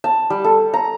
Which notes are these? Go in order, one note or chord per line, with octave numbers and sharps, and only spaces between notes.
A5
G3
A4
A#5